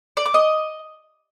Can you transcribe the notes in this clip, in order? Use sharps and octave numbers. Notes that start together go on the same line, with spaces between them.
D5
D6
D#5